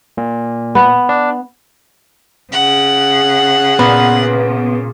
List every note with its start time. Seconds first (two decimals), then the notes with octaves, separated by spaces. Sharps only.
0.17 A#2
0.75 B3
1.09 D4
2.52 C#3 F#5
3.79 A#2 B3